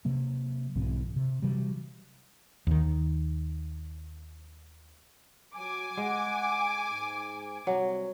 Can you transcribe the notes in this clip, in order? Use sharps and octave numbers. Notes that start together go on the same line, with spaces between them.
C3 F#3 A#3
B1 G#2 E3 C4
C3
C3 E3 F#3 G3
D#2 D#3
F#3 G#5 D6
G#3 F#5
G#2
C3 F#3 G3